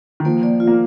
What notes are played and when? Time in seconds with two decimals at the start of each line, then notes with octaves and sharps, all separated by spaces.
0.20 D#3
0.25 F3 A#3
0.43 D5
0.60 F4
0.67 A#3